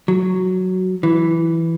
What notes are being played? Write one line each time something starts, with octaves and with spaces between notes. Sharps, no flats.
F#3
E3